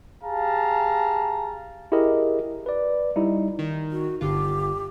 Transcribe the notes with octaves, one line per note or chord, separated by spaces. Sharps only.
G4 G#4 F5 A5 A#5
E4 G4 G#4 A#4 D#5
B4 D5
G3 D#4 E4
D#3
F#4
G1 D3 F4 G4